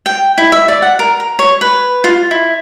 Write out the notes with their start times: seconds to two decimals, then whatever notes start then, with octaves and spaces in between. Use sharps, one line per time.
0.06 G5
0.38 E4
0.52 E5
0.68 D5
0.82 F#5
0.99 A#4
1.20 A#5
1.39 C#5
1.61 B4
2.04 F4
2.31 E4